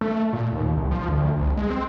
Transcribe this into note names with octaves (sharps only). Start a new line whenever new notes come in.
A3
A#2
D#2
C2
F3
D2
C2
G#3
C4